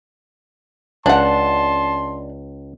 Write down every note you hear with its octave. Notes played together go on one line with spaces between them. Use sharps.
C#2 D4 F#5 A5 C6